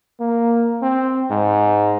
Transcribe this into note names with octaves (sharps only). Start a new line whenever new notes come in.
A#3
C4
G#2